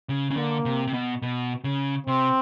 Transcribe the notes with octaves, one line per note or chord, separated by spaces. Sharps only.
C#3
C#3
D3 A#3
C3
C3
B2
B2
C#3
C3 C4